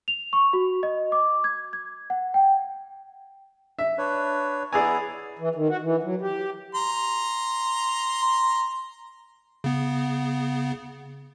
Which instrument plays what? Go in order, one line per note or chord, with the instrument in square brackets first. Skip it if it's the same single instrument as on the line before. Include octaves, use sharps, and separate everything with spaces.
[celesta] F7
C#6
F#4
D#5
D6
G#6
G#6
F#5
G5
[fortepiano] E5
[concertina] D4 B4 C#5
[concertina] B3 E4 A#5 [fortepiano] G#4 D5 G#5
[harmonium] E3
D#3
F#4
E3
F#3
G4
[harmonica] A#5 C6
[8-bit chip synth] C#3 B3